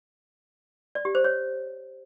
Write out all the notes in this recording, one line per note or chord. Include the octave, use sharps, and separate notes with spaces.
D5
G4
C5
C#5